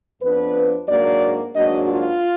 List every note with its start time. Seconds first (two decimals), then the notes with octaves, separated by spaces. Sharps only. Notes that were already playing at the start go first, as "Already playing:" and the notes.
0.21 F2 F3 B3 D4 B4
0.89 G#2 F#3 A#3 D4 D5
1.56 G#2 F#3 A#3 D4 D#5
1.89 F4